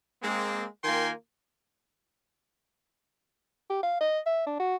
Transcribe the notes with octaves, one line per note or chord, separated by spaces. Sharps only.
G#3 A#3 C4
D#3 A#3 F4 G5 G#5 C6
G4
F5
D#5
E5
D4
F#4